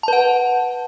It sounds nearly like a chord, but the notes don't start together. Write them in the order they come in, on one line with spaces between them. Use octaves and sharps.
A5 B4 F#5